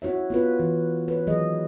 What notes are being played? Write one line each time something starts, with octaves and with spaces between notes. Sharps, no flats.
E4 F#4 C#5 E5
B3 F4 B4
E3
B4 C#5
D#3 E3 F#3 G#3 G#4 D#5